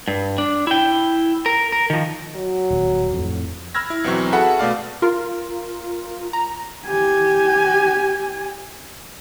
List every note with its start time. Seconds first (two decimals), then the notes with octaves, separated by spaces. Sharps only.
0.08 G2
0.38 D4
0.67 E4 G5
1.46 A#4
1.72 A#4
1.90 D#3 F3
2.36 F#3
2.71 D#1
3.13 F2 A2
3.75 B5 E6 F6 G#6 A#6
3.90 E4
4.04 B1 E3 F#3 C4 C#6
4.32 F#4 G#4 A4 E5 F#5 B5
4.59 B2 A3 D5 F5
5.02 F4 A#4
6.33 A#5
6.86 G4 G#5